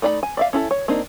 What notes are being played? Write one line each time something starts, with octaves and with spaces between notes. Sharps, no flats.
A3 D#4 D5 A#5 B5
G#5
D5 E5 F5
C#4 E4 A4
C#5
A#3 C4 D4 D#4